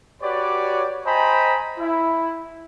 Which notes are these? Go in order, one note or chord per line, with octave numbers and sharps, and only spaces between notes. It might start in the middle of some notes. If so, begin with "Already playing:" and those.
F#4 G4 B4 C#5 D5
C5 D#5 G5 G#5 A#5 B5
E4